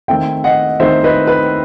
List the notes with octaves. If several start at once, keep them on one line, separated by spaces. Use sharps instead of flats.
D#3 A3 C4 D#4 E5 G5
D#5 F#5
D#3 A3 C4 D#4 C5 E5
B4 D#5
B4